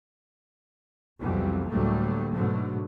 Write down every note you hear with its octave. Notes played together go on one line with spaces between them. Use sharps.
C2 F2 B2 E3 F#3 G3
D2 A2 F#3 G3 A3 A#3
G#2 B2 D3 F#3 A3